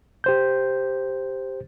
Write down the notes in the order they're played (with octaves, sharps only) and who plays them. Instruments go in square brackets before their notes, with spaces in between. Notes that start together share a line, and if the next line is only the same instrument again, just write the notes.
[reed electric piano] G4 C5 G6